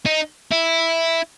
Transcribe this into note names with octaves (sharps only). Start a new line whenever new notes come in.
D#4
E4